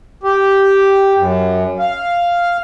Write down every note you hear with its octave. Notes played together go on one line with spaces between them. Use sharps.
G4
F#2
F5